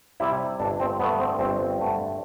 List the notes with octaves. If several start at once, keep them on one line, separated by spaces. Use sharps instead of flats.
C3 G3 E4
G1 D4
C4
G2 D3 A3 B3
C4
G1 C4
G2 D3 A3